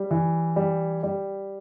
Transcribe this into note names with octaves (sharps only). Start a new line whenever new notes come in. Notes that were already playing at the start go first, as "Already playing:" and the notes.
Already playing: G3
E3
G3
G3